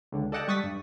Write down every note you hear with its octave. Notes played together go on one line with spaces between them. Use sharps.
C#2 D3
A4 D5 D#5 F#5 G5 A5
G3 C#6 D#6 A6 B6
G2